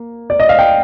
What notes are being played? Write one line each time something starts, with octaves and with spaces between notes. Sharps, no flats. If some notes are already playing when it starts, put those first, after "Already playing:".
Already playing: A#3
D5
D#5
F5
G5